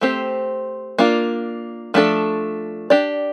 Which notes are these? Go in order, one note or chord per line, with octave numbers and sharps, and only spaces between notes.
A3 C4 G4 C5
A#3 D4 F4
F3 A3 D4 A4
D4 G4 D5